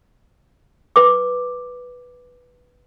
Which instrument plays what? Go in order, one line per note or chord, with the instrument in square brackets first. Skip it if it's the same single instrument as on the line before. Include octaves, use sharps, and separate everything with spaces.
[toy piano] B4 D6